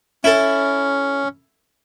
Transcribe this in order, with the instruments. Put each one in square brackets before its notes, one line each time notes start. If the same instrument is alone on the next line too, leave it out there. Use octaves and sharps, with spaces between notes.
[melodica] C#4 [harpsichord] E4 A4